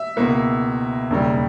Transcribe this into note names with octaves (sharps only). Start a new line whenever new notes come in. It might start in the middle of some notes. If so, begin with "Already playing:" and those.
Already playing: E5
C#2 B2 A#3 E4
E1 D#2 C#3 G3